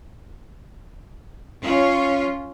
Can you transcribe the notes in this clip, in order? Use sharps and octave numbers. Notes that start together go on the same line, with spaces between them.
C#4 F4